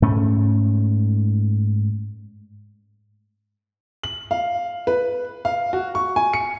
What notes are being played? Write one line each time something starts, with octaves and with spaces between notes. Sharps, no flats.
G#2 A3 C#4
F#7
F5
B4
F5
F#4
C#6
G#5
C#7